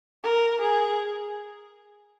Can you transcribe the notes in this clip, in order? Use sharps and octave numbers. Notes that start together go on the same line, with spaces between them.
A#4
G#4